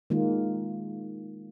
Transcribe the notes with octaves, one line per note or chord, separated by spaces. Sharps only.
D#3 G#3 A#3 F4